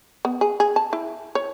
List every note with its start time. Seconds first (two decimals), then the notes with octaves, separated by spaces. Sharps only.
0.25 B3
0.41 G#4
0.60 G#4
0.76 A5
0.93 E4
1.35 C#5